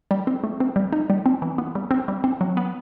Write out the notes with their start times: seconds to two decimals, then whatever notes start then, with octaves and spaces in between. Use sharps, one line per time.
0.11 G3
0.27 C4
0.44 A3
0.60 C4
0.76 G3
0.93 D#4
1.10 G3
1.26 C4
1.42 E3
1.58 B3
1.75 G3
1.91 C4
2.08 G3
2.24 C4
2.41 F#3
2.57 B3